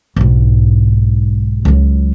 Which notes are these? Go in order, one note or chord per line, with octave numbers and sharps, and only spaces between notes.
B1 G#2
C#2 F#3